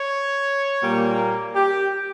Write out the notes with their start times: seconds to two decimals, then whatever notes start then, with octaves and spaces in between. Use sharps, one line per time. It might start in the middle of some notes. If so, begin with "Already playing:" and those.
Already playing: C#5
0.83 A#2 G3 A#3
1.55 G4